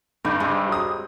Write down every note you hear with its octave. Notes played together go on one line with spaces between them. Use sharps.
G2 B2 G3 D#4
G3 G#3 C4
F#3 D#6